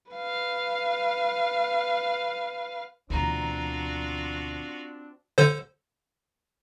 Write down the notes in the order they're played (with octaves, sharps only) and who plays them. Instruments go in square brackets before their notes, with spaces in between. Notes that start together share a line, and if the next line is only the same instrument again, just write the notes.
[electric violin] B4 F5
[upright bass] D2 B2 [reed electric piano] E3 A#5 [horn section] C4 D4 [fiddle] F4 F#4
[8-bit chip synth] D3 A4 C5